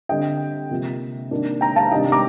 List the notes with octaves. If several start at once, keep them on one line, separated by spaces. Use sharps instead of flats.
D3 G3 C4 D#5 G5
C3 F3 A#3
C3 D#3 A#3 D4
G5 A#5
F5 A5
C3 D#3 G3 D4 D#5 G5
A#5 D6